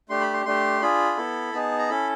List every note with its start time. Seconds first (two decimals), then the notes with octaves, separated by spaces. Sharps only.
0.09 A3 D4 G4 C6
0.21 B5
0.33 C6
0.45 A3 D4 G4 C6
0.82 D4 F4 G#4 B5
1.17 B3 E4 A4
1.53 B3 D#4 G#4 A5
1.79 A#5
1.89 C#4 E4 A4 B5